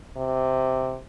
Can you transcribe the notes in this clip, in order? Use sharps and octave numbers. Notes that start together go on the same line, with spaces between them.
C3